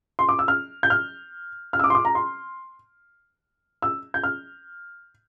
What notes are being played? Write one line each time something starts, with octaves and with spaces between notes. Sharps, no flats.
C6
D6
E6
F6
G6
F6
F6
E6
D6
C6
D6
A#5
C6
E6
G6
F6